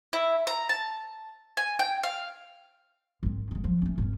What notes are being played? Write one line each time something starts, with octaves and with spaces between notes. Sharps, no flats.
E4
A#5
A5
G#5
G5
F5
G#1 C4
C#3 G#3
F3 F#3
A3 C#4
G#1 C#4